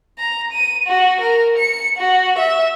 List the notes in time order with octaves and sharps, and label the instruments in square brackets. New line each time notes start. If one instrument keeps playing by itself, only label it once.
[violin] A#5
D#7
F#4
A#4
C#7
F#4
E5